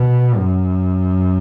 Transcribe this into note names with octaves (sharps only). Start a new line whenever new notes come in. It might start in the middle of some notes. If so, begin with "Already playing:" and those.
Already playing: B2
F#2